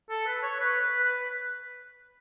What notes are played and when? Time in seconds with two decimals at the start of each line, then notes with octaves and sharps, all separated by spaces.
0.10 A4
0.26 B4
0.43 C#5
0.60 B4
0.81 B4
1.03 B4